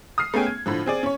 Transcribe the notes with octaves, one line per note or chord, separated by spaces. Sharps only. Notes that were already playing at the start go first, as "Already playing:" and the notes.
D#6 F6 C7
A3 B3 C#4 G#4 G5
G#6
A2 D3 F3
C4 G#4 D5
C#4 C#5